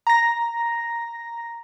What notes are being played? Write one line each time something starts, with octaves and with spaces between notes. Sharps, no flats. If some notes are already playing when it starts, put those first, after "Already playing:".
A#5 A#6